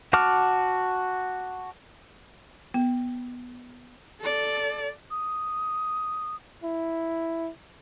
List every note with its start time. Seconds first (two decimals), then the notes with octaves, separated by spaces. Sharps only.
0.13 F#4 F#5 A5 D6 F6
2.74 B3
4.21 A4 D5
5.11 D#6
6.64 E4